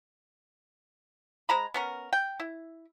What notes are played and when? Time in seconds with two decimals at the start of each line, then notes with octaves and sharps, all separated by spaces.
1.49 G#3 C5 A#5 B5
1.74 B3 C#4 A#4
2.13 G5
2.40 E4